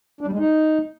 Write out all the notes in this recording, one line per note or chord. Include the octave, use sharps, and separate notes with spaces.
D4
G3
G#3
D#4